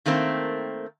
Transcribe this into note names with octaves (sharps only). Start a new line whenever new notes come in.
D#3 A3 A#3 C4